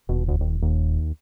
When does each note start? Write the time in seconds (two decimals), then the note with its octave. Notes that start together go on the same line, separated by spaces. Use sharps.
0.09 D#1 B2
0.28 D2
0.40 D#2
0.62 D#2